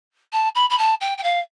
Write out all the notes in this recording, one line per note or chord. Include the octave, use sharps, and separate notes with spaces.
A5
B5
B5
A5
G5
G5
F5